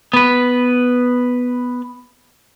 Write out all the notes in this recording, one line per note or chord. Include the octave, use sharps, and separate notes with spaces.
B3 B4